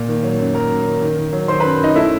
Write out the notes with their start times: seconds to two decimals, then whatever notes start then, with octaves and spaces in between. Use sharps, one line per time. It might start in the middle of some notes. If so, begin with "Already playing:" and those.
Already playing: A#2
0.08 D#3
0.23 F#3
0.40 F#2
0.55 F#3 A#4 A#5
0.71 F#2
0.86 D#3
1.02 D#3
1.17 D#3
1.32 F#3
1.48 D#3 C5 C6
1.60 B4 B5
1.64 F#2
1.80 F#2 D#4 D#5
1.95 A3 E4 E5